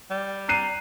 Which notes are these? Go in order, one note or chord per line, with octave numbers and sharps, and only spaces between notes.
G3
A#5 F#6 C7 D#7